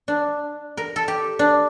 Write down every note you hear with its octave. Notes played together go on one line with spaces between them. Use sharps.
D4
A#4
A4
G4
D4